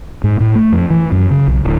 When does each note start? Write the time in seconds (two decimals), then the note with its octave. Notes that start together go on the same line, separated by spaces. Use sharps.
0.24 G#2
0.40 A2
0.55 A3
0.72 F2
0.90 E3
1.12 F#2
1.31 C#3
1.47 B1
1.64 D1